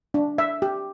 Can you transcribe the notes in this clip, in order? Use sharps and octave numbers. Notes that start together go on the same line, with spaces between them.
D4
E5
G4